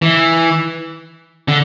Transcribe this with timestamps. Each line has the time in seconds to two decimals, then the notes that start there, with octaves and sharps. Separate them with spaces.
0.02 E3
1.48 D3